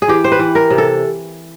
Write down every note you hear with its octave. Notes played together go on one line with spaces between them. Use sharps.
G#4
E3 G4
C5
B4
E3
A#4
C3
A4